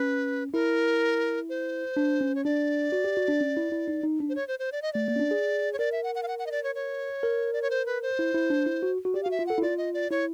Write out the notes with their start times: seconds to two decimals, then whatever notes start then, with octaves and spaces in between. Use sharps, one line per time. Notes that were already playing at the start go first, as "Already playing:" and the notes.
Already playing: C#4 B4
0.53 E4 A#4
1.49 C5
1.97 D4
2.21 C#4
2.35 C#5
2.45 D4 D5
2.92 F#4
3.04 G4
3.17 F#4
3.28 D4
3.41 C#4
3.57 E4
3.72 E4
3.88 D#4
4.03 D#4
4.20 D4
4.29 C5
4.35 C#5
4.48 C5
4.59 C5
4.72 D5
4.82 D#5
4.93 A3 D5
5.08 A#3
5.16 C#4
5.20 D4
5.31 G#4
5.73 C#5
5.79 A#4 D5
5.92 E5
6.04 F#5
6.15 F#5
6.23 F5
6.28 F#5
6.39 F#5
6.46 D#5
6.51 D5
6.64 C#5
6.75 C#5
7.23 A#4
7.53 D5
7.62 C#5
7.70 C5
7.86 B4
8.02 C5
8.19 E4
8.34 E4
8.50 D4
8.66 E4
8.83 F#4
9.05 F#4
9.14 G4 D5
9.23 F5
9.26 F#4
9.31 E5
9.39 F4
9.47 A4 F#5
9.58 E4
9.62 F4 D5
9.78 D#5
9.94 D5
10.11 E4 C#5